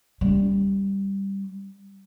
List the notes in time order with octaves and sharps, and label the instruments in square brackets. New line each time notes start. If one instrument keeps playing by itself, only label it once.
[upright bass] G3 C#4